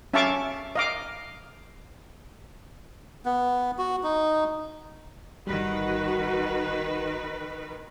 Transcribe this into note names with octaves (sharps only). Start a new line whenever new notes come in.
C#4 E5 F5 A5 C#6 D6
D#5 F5 D6
B3
F#4
D#4
G1 D#3 G3 F#4 B4